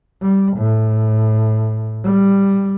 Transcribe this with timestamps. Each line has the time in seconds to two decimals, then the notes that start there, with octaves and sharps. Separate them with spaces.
0.22 G3
0.58 A2
2.04 G3